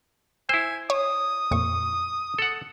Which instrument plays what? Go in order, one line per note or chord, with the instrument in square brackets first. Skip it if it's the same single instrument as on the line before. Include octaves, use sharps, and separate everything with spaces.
[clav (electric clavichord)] E4 C5 [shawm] G#5 [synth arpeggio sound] E6
[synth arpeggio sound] C#5 [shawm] D#6
[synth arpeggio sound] F2 A#2 C#6
[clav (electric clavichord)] A4 F#5